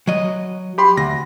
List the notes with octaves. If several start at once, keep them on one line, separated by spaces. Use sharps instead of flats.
F#3 D#5
G4 B5 C6
D2 A#6